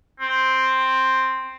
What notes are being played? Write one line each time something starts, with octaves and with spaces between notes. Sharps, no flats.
C4